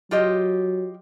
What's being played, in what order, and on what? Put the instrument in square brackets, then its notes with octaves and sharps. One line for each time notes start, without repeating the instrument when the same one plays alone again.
[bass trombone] F#3 [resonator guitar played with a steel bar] F4 G4 D#5